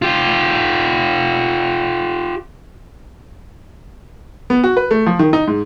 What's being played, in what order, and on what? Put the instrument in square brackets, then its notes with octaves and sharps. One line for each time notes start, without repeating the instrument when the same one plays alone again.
[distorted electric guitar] F4 G4
[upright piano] B3
F#4
B4
A3
F3
D#3
D#4
G#2